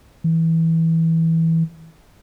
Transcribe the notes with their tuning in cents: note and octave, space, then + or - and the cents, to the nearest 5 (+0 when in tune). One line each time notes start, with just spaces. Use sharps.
E3 -15